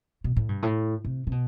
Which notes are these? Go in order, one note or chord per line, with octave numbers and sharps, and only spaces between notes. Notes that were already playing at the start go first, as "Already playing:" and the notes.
B2
A2
G2
A2
C3
C3
B2